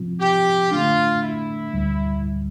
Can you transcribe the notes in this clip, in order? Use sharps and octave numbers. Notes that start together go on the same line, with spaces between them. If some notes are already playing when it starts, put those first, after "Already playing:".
Already playing: C3 F3 C4 F4
G4
D3 A3 D4 F4
E4
D2 D3 G3